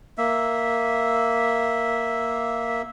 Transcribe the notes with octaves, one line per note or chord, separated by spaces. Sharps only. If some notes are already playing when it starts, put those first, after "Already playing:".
A#3 E5